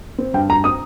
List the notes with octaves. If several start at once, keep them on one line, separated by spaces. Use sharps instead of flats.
C4
G2 G5
G2 A#5
C4 D#6